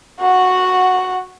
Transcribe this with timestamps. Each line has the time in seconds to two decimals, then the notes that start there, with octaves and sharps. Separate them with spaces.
0.20 F#4 F#5